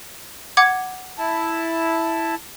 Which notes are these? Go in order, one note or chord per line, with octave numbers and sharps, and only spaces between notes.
F#5 D6 G#6
E4 A5